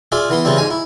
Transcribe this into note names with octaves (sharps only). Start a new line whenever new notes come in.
F4 G#4 D5 E5
E3 B3 C6
C#3 E3 F3 G3 C4
G#2 G#5 A#5
E4